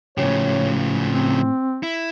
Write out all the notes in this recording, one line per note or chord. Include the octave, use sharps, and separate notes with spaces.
A2 C#3 F3 C#4 G4 C#5
C4
E4